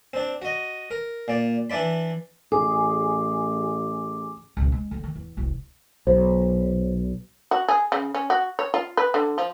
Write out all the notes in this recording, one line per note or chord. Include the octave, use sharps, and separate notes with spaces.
C4 D4
F#4 D#5
A#4
A#2 D5
E3 D4 E4 D5 B5
A1 G#4 D6
C#2 B2
G#3
D3 C4
D#3
E2
E1 C2
B1 C5
F#4
G#4
C#3
C#4
F#4
C#5
F4
B4
D3
F3